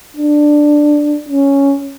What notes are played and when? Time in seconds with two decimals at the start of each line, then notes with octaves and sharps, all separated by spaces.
0.16 D4
1.28 C#4